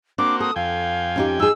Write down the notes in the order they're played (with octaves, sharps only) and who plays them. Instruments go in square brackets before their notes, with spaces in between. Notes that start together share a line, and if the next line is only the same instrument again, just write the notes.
[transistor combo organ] A#3 C4 F#4 [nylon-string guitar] D4 [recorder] D6
[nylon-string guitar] A4 [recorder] D#6
[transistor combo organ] F2 G5 G#5 [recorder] F5
[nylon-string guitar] C#4 D#4 G4
[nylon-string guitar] D#4 G#4 [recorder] E6